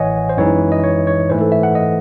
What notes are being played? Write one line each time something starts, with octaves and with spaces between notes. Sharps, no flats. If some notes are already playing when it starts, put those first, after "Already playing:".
Already playing: A1 A2 E3 C#5 D#5 F#5 G#5
C5
F#2 E3 G#3 D#4 C#5
D#5
C#5
C#5
G#2 E3 A3 C5
A4
E5
F#5
D#5